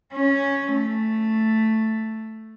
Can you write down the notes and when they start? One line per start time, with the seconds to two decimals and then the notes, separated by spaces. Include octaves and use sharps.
0.14 C#4
0.74 A3